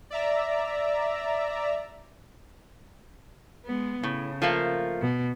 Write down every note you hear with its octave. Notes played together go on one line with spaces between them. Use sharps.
D5 E5 A#5
G#3 B3
A2 C#3
F3 A3 A#3
B2